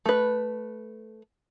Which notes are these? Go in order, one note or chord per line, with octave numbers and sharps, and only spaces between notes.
A3 B4